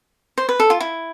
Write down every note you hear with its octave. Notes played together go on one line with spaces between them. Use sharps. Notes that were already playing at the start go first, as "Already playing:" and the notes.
C5
B4
A4
F4
E4